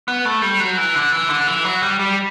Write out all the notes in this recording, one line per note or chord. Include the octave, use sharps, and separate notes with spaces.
B3
A3
G3
F#3
E3
D3
E3
D3
E3
F#3
G3
G3